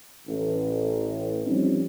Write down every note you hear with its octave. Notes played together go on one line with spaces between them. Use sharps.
A1
F3 G3 C4 C#4 D#4